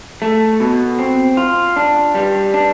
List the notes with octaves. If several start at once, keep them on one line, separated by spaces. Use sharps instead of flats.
A3
B2
C4
F4
D4
G3
D4